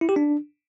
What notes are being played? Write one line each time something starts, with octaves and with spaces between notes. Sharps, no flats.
E4
G4
D4